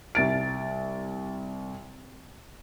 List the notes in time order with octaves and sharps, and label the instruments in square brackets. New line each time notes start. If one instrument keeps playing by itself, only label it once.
[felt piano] C2 A6 D7